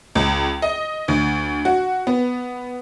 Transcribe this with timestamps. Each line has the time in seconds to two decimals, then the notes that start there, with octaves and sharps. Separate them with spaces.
0.15 C#2
0.62 D#5
1.08 D2
1.65 F#4
2.07 B3